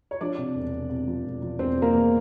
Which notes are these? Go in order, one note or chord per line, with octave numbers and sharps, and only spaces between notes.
C#5
F3 D4 D5
C3
E1
C3
C3
F3
E1
F3
E1 C4 C5
F3 A#3 A#4
E2